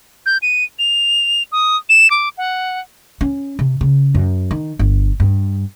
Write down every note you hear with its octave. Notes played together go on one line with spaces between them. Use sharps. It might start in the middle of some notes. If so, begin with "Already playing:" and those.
G6
D#7
F7
D#6
E7
D6
F#5
C#4
C3
C#3
F#2
D#3
G1
G2